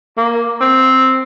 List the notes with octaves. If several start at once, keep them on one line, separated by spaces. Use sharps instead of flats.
A#3
C4